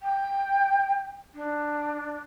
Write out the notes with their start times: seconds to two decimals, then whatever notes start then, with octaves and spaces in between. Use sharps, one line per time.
0.02 G5
1.35 D4